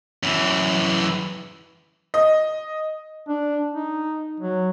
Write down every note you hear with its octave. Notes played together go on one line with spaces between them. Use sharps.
F#2 E3
D#5
D4
D#4
F#3